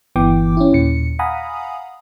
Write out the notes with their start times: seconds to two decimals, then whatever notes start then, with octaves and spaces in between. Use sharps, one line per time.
0.16 G1 E3 B3 G5 D6
0.57 C#4 E4
0.72 D#2 A#2 C#7
1.19 F5 F#5 G#5 A#5 B5 D#6